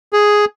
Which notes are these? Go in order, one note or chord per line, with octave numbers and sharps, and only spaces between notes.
G#4